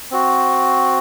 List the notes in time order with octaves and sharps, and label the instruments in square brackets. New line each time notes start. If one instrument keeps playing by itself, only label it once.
[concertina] C4 F#4